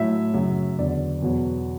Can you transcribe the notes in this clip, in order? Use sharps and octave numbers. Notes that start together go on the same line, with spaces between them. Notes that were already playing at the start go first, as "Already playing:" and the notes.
Already playing: A2 F#3 E5
F#2 C#3 F#3
E2 D3 F#3 D5
E2 B2 F#3